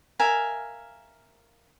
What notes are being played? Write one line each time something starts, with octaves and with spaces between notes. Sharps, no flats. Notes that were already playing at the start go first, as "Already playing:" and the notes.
A#4 E5 F5 G#5